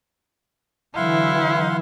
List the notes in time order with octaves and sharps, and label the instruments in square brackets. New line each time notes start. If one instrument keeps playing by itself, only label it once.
[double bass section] D3 E3 F#3 [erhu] E4 [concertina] F5 F#5 C6